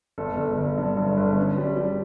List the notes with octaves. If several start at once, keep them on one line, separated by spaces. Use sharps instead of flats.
G1 A4
G1
G1
G2
G2
G1
C#4
G3
G3